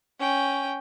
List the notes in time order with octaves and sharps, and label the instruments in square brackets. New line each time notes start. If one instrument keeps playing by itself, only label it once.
[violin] C#4 G5